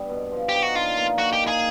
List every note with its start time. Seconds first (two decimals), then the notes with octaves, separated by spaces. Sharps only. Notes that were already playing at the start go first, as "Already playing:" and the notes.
Already playing: G2 G3 B3
0.09 B2
0.32 F3
0.49 D#4 G4
0.63 F#4
0.75 D3 F4
0.97 A#3
1.18 D#3 F#4
1.33 G4
1.41 A#3
1.47 G#4